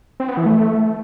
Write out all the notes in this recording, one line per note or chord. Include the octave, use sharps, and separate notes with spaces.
C4
B3
E3
A3